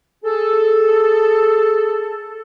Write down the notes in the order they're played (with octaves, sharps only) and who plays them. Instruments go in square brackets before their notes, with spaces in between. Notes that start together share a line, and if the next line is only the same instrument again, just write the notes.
[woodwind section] G#4 A4